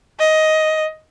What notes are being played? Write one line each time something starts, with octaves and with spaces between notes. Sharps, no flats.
D#5